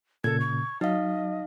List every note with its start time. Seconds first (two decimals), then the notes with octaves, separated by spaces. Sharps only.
0.24 A#2 C#3 A4 G#6
0.40 C#6
0.81 F#3 D#4 D#5 F5